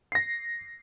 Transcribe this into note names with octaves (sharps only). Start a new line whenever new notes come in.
A#6 C7